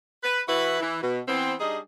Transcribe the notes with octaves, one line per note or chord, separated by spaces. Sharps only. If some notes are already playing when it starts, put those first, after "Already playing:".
B4
E3 E4 F#4 B4
E3
B2
E3 B3 C4
G3 D4 D#4 G#4 D#5